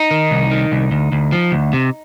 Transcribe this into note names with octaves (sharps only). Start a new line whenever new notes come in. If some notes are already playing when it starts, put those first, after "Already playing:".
Already playing: D#4
D#3
C2
D#3
C2
D2
D2
F3
D2
C3